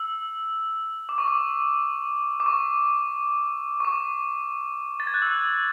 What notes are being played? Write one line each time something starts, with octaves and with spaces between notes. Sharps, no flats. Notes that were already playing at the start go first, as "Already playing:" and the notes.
Already playing: E6
D6
C#6
D6
D6
C#6
C#6
D6
A6
G#6
F#6
E6